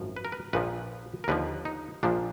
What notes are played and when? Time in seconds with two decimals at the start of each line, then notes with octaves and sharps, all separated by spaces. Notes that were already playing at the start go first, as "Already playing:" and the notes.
Already playing: G#1 F#2 F3
0.16 B4
0.25 A#4
0.32 B4
0.53 A#1 A#2 F3 B4
1.24 A#4
1.28 D#2 D3 F3 B4
1.65 D#4
2.03 A#1 A#2 F3 D4